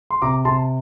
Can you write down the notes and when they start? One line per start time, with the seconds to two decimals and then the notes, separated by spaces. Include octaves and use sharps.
0.10 C6
0.22 C3 A#5 D6
0.45 C3 A5 C6